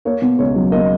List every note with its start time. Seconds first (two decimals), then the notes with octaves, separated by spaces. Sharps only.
0.05 A#3 C#5
0.22 B2
0.39 C#2 C#5
0.56 F#3
0.72 A#3 D#5